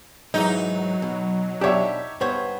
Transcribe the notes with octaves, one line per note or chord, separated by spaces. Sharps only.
G#2 E3 F#3 D#4
B2
B2 D4 G4 C#5 E5
G2 B3 C5 C#5